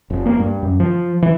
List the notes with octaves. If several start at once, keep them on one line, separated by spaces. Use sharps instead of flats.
F1
A#3
G2
F#2
F3
E3